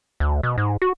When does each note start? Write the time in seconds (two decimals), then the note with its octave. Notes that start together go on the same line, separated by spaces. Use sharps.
0.20 D2
0.43 B2
0.58 G#2
0.82 F#4